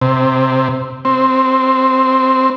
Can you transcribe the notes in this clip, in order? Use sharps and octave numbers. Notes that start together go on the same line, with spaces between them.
C3
C4